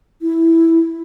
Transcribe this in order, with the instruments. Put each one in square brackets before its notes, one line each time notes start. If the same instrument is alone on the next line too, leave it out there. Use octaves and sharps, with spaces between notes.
[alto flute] E4